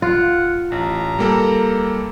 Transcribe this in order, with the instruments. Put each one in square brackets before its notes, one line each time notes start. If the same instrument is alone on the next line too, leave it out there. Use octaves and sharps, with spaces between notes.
[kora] F4 [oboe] F#5
[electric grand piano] A1 [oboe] A#5
[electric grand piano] G3 A#3 A4